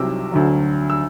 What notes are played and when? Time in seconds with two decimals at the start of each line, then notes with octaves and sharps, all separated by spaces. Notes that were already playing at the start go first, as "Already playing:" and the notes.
Already playing: C2 C3 F#3 C4 D6 E6
0.32 D2 D3 F#3
0.90 E6